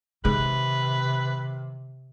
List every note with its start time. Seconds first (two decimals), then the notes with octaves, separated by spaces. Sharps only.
0.25 C3 D#3 G#3 B4